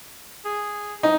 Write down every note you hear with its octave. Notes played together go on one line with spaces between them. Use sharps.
G#4
D#4